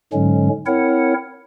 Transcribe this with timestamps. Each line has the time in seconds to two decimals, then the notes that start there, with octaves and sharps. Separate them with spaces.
0.13 G#2 D3 F#3 G#3 C#4
0.66 C4 E4 A#4 C#5 F#5